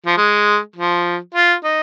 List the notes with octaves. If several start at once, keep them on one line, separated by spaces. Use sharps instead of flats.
F3
G#3
F3
F4
D#4